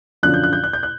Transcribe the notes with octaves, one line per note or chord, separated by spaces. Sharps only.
F#2 D3 F3 F#6
G6
F#6
G6
F#6
G6
F#6